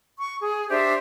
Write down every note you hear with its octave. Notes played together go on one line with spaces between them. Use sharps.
C#6
G#4
D4 G4 C5 E5